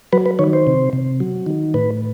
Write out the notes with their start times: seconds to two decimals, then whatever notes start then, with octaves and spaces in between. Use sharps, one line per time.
0.13 F#3 B4
0.26 B4
0.39 D#3 C#5
0.53 C5
0.67 C3
0.93 C3
1.20 F#3
1.46 D#3
1.74 A2 B4